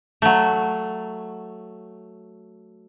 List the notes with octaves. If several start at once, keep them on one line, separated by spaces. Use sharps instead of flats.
F#3 A3